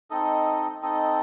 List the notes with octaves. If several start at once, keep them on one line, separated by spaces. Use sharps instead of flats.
C4 D#4 A4 D#5
C4 D#4 A4 D#5